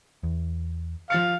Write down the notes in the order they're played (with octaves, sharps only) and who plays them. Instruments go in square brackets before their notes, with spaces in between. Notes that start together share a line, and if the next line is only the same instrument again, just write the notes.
[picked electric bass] E2
[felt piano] F3 A6 C#7 [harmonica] F5